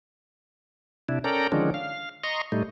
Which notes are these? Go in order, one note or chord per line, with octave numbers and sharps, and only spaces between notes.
C3 D4 E4
C#4 A4 A#4 D5 G5 A#5
D3 D#3 F3 G#3 C#4 D4
F5
D#5 A#5 C6 C#6
A2 G3 A3 D#4